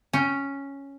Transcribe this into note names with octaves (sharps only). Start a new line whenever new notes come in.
C#4 G5